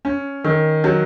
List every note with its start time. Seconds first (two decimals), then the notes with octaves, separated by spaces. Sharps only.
0.05 C#4
0.44 D#3
0.84 F#3